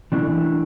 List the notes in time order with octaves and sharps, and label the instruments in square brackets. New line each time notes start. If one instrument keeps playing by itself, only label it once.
[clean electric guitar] E3 A3 D4